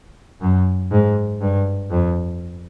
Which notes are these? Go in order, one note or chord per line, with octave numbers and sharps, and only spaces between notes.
F#2
G#2
G2
F2